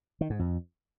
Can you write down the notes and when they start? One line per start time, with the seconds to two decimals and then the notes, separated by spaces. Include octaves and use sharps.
0.21 D#3
0.30 G#2
0.39 F2